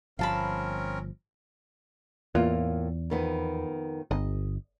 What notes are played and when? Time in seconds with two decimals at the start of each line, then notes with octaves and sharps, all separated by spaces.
0.19 G1 F3 C4 C#4 A#4 F5 A5 B5
2.35 E2 A2 A#3 F4
3.10 F2 D#3 B3
4.11 G1 D#5